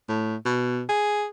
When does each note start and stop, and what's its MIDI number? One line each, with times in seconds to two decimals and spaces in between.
0.09 0.36 45
0.46 0.84 47
0.89 1.26 68